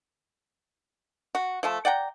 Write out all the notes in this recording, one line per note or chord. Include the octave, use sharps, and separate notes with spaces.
F#4
F3 A3 A5
D5 F#5 G5 A#5